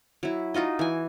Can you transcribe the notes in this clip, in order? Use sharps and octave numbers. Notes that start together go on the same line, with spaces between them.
F#3 E4
D#4 F4 F#4 D#5
E3 G#5